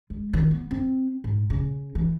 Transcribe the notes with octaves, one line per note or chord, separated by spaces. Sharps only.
G#3
D#3
B3
C4
G#2
C#3
E3